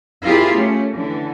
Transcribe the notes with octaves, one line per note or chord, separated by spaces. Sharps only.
C4 E4 F4 G4 G#4 A#4
A3 C#4
D3 E3